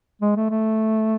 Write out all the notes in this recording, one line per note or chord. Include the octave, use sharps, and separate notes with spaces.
G#3
A3
A3